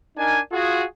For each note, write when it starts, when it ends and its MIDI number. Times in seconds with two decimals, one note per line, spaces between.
0.17 0.40 62
0.17 0.40 63
0.17 0.40 70
0.17 0.40 80
0.52 0.84 65
0.52 0.84 66
0.52 0.84 68